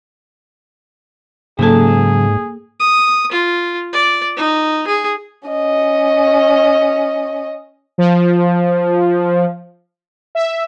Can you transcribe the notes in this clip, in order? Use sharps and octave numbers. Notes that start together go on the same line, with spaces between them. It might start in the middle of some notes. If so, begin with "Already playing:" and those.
G#2 C#3 F#3 A#3 G#4 A4 A5
D#6
F4
D5
D#4
G#4
C#4 D#5
F3
E5